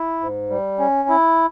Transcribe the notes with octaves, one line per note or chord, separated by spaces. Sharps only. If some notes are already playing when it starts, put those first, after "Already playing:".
Already playing: E4
G#2
G3
C#4
E4